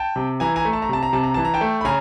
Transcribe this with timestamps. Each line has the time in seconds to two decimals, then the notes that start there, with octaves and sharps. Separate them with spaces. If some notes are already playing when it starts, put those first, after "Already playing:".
Already playing: G5 A5
0.16 C3
0.40 E3 G#5 A#5
0.56 G#5 A#5
0.65 A3
0.73 A5
0.82 A#5
0.89 C3 A5
1.03 A#5
1.13 C3 A5
1.24 A#5
1.34 E3 A5
1.45 A#5
1.54 G5 A5
1.61 A3
1.81 B5
1.85 C#3 G#5 A#5